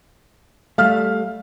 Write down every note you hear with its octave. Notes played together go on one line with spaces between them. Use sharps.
G3 A3 F5 F6